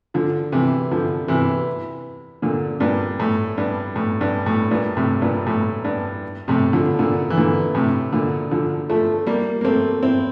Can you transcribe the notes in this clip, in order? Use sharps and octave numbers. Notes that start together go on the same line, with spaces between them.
D3 F3
C3 E3
D3 F3
C3 E3
A#2 D3
G2 A#2
A2
G2
A2
G2
A2
G2 A#2
A2 C3
G2 A#2
A2
G2
A2 C3
D3 F3
A#2 D3
E3
A#2 D3
A2 C3
A#2 D3
D3 F3
F3 A3
G3 A#3
A#3
A3 C4
C4 E4